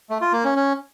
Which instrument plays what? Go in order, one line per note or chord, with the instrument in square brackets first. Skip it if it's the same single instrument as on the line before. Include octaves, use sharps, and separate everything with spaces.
[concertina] A3
F4
A#3
C#4
C#4